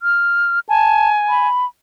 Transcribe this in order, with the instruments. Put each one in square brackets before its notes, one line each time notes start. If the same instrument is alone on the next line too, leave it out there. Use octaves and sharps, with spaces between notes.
[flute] F6
[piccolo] G#5 [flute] A5
[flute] B5